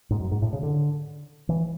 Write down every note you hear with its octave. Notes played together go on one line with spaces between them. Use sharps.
G#2
F#2
G#2
A2
C#3
D3
E3